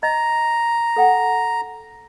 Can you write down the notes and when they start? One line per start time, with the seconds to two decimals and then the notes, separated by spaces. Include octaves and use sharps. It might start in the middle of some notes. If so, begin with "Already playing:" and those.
0.03 D#5 A#5
0.96 A4 F#5 G5